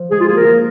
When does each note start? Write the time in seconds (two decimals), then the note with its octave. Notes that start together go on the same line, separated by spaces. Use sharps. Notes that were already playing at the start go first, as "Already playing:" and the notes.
Already playing: F3
0.11 G#3 G#4
0.20 F4
0.28 A#3 G#4
0.37 A#4
0.44 A#3